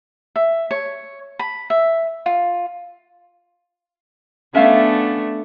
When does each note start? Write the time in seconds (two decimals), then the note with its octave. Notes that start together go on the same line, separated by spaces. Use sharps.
0.36 E5
0.71 C#5
1.39 B5
1.70 E5
2.26 F4
4.55 A3 B3 C#4 D4 E5 F5